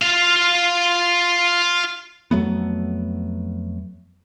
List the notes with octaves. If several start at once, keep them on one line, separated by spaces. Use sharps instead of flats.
F4 F5
F2 F#3 A3 B3